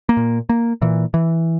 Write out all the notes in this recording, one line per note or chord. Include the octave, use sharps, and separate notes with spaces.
A#3
A#2
A#3
A#2 E3
E3